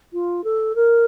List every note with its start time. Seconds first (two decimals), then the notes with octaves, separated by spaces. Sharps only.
0.13 F4
0.44 A4
0.75 A#4